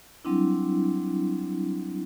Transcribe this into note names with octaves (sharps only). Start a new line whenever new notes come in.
F#3 G3 C4 D4 E4